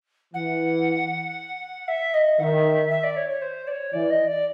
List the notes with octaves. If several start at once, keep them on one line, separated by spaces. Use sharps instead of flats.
E3 F#5
E5
D#5
D#3 E5 F#5
E5
D5
C#5
C#5
C5
D5
C#5
E3 D5
D#5
D5